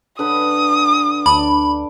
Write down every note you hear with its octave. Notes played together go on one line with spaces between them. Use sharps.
D3 B4 B5 D#6
D2 D4 B5 D6